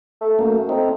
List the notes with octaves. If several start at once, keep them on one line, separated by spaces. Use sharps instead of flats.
A3
F#2 A3 A#3
A3 C4 D#4